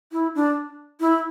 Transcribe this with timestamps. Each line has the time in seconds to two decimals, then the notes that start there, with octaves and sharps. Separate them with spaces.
0.12 E4
0.35 D4
1.00 E4